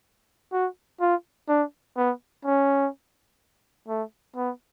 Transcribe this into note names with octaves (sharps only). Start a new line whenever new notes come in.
F#4
F4
D4
B3
C#4
A3
B3